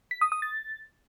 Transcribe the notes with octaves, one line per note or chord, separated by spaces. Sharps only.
B6
D#6
D#6
A6